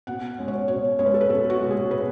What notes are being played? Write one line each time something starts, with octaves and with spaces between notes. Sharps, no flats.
B2 F#5
G#3 C#4
C#5
B2 C#5
G#3 C#4 C#5
B4
A4
B4
B2 A4
F#4
G#3 C#4
G#4
B2 B4